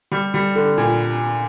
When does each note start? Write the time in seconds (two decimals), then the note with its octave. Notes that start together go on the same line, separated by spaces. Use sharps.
0.12 G3
0.34 G3
0.55 D3
0.77 A#2